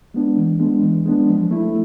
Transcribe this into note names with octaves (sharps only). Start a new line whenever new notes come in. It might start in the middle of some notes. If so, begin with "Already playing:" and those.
G#3 B3 D4
E3
G#3 B3 D4
E3
G#3 B3 D4
F3
A3 E4